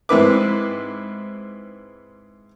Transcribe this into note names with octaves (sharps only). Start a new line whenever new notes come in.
G#2 C4 E4 B4 D6